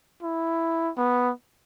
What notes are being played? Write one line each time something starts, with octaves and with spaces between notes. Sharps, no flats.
E4
B3